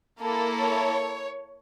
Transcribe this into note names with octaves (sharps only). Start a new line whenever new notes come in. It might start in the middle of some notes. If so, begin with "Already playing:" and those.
A#3 E4 A4
C#5